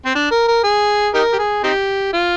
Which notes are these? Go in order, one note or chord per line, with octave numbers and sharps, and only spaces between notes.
C4
D4
A#4
A#4
G#4
D#4 G4 A#4
G4
G#4
C4 D#4 G4
F4